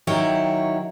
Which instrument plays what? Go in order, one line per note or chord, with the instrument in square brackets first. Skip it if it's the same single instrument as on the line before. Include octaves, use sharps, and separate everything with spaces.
[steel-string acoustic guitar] D#3 F#3 E4 C#5 G5